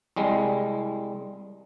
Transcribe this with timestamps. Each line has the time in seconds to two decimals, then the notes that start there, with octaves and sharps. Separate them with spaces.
0.16 C2 G3 G#3